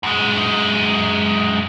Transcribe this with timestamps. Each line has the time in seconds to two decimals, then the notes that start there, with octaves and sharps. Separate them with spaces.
0.03 F#2 G#3